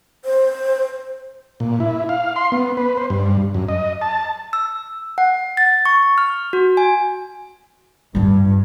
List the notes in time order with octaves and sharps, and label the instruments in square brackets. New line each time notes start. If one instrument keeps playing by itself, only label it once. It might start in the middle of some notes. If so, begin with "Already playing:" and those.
[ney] C5
[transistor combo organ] A#2
E4
F5
C6
B3
B4
C5
G2
F#2
D#5
A5
[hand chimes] E6
F#5
A6
C#6
F6
F#4
G#5
[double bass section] G2 [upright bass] G3 F4